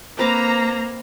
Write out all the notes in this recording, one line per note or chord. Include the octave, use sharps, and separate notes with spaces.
A#3 C4 B4 A#5 D6